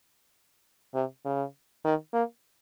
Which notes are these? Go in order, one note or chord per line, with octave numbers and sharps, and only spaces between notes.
C3
C#3
D#3
A#3